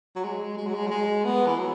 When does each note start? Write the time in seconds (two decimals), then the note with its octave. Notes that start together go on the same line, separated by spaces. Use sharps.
0.16 F#3
0.24 G#3
0.58 G#3
0.67 F#3
0.74 G#3
0.87 F#3
0.91 G#3
1.25 B3
1.47 E3
1.59 F#3